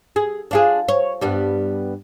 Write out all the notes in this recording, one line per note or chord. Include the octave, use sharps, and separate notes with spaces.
G#4
D4 F4 G#4
C#5
G2 G3 B3